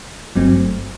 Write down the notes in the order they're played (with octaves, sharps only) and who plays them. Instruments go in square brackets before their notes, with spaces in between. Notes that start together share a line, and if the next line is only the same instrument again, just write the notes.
[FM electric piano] G1 G2 F#3 A3 C4